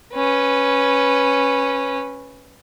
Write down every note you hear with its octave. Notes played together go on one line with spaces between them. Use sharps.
C#4 B4